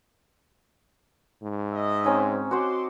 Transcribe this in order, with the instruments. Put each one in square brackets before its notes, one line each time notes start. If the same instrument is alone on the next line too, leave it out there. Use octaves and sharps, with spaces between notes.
[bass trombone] G#2
[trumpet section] D#5 E5
[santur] C4 C#4 D#4
[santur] F#4 C5 F#5 [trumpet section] C6 D6